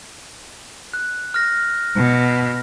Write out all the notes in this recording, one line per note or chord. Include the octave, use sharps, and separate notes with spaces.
F#6
F6 A#6
B2